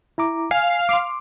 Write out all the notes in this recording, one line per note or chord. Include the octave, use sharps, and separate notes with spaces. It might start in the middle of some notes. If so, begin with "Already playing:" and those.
E4 A#5 D6
F5 G#5
C6 D6